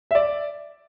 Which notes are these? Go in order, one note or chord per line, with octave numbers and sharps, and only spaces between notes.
E5
D5